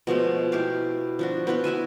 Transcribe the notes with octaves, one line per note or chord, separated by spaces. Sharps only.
B2 F3 G#3 A3
E4 G4 F5
F3 D4 F#4
B3 E4 F4 B4
E4 F#4 E5 G#5